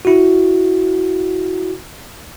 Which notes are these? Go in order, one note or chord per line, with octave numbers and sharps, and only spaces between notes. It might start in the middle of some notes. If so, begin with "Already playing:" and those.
E4 F#4